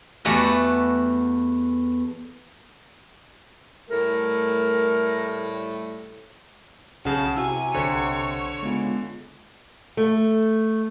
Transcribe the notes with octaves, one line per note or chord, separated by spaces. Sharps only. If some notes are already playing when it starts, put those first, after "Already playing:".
E2 A3 F#4 G4 B4
A2 G3 A3 A#4
B1 C#3 C#4 F#5 A5
C3 E4 F#4 G#5 C#6 E6
B1 D3 C5 C#5 G#6 C#7
C#3 G#3 B3 F4
A3